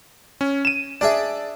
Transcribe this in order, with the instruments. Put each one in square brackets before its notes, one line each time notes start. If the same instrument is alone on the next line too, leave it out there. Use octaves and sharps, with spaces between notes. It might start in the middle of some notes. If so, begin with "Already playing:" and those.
[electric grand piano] C#4
D#7 E7
[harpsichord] D4 G#4 E5 [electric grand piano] D5